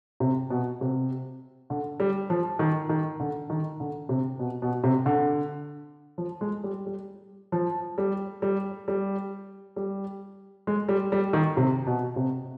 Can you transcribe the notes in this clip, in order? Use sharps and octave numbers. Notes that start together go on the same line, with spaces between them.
C3
B2
C3
D3
G3
F3
D#3
D#3
D3
D#3
D3
C3
B2
B2
C3
D3
F3
G#3
G3
G3
F3
G3
G3
G3
G3
G#3
G3
G3
D#3
C3
B2
C3